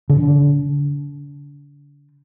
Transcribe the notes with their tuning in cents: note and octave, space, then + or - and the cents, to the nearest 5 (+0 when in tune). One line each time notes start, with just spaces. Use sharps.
D3 -35